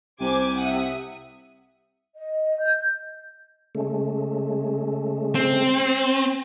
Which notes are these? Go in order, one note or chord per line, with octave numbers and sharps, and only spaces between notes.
C2 C3 C5 G#5 D6
E5 F#5 D#6
D#5
G6
C#3 G#3 A3
C4